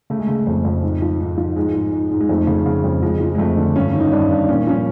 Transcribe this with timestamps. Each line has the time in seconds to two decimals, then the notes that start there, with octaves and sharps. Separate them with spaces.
0.10 C#3 A3
0.19 G#3
0.27 C#3 A3
0.47 F2
0.65 F2
0.83 G#2
1.02 F3
1.20 G#2
1.38 F3
1.56 G#2 G#3
1.75 G#2
1.92 G#2
2.11 G#2
2.21 G#3
2.29 F2 A3
2.47 C#3
2.66 C#3
2.84 F2
3.02 F3 G#3
3.20 F3
3.35 G#3
3.38 F2 A3
3.57 D3
3.75 G2 C#4
3.93 D#3
4.00 D#4
4.12 G2 D4
4.31 G2
4.49 A#2 C#4
4.67 F3 C#4